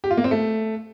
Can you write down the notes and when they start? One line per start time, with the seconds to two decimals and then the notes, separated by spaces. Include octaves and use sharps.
0.04 G4
0.11 F4
0.17 A#3
0.24 C4
0.31 A3